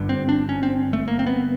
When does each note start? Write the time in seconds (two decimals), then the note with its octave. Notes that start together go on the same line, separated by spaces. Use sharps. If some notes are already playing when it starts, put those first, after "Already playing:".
Already playing: G1 G2 D3
0.09 C4
0.29 D4
0.49 C#4
0.63 C4
0.93 A3
1.08 A#3
1.19 C4
1.27 B3